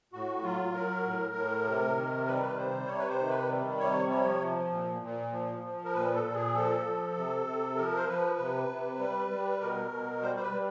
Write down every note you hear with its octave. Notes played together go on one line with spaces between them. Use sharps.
A2 F#4
F#3 F4
F#3 A#4
A2
A2
C3
D#3
G3 B4
A#4
B4
C3 C5
C3 C#5
B4
C5
D#3
B4
G3
C3 C#5
F3 C#5
F3
A#2
A#2
F3
F3
A#4
A#2 B4
A4
A#2
G#4
F3 A4
F3
C3
C3
F3 A#4
C5
F3 B4
C3
C3
G3
G3
B2 A#4
B2
G3 C5
C5
B4
G3